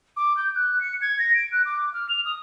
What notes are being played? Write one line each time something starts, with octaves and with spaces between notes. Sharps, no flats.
D6
G6
F#6
C#7
G#6
A#6
D7
F#6
D6
F6
F7
D#6